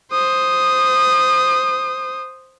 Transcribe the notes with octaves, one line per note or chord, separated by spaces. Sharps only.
C5 D#6